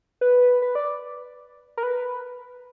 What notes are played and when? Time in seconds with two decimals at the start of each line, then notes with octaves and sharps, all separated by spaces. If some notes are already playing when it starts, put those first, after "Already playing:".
0.21 B4
0.62 B4
0.75 D5
1.77 A#4
1.83 B4